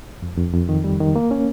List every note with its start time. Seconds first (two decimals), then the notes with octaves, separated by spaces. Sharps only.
0.22 F2
0.38 F2
0.53 F2
0.69 D#3
0.84 G3
1.00 D#3
1.16 A#3
1.31 C#4